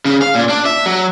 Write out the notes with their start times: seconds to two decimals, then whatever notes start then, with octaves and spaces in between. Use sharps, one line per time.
0.05 C#3
0.22 F5
0.35 A#2
0.49 D4
0.66 E5
0.86 F#3